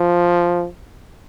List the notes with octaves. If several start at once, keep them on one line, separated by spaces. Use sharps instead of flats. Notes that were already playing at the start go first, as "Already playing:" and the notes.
Already playing: F3